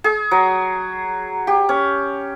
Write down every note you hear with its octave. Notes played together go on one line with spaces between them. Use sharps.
G#4
F#3
G4
C#4